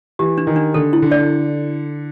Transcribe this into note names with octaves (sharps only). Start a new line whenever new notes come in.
E3 G4
D4
D#3
D4
D3 A4
E4
D3
D5